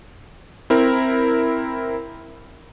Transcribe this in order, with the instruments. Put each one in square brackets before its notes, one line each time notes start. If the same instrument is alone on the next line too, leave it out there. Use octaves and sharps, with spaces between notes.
[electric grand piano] C4 E4 A#4